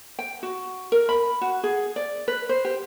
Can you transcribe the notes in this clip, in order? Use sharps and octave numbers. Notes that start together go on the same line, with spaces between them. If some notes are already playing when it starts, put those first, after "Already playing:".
G5
F#4
A#4
B5
F#4
G#4
D5
B4
C5
G4